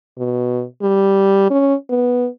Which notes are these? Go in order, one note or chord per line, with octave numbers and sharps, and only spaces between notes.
B2
G3
C#4
B3